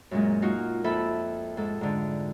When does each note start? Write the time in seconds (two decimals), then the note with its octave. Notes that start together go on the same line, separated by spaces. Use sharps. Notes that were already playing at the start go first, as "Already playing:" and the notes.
0.11 F#2 A#2 G#3
0.42 A#3 D#4 F4 F#4
0.84 F2 A#3 A4 E5 B5
1.57 G#2 A4
1.81 G#2 D3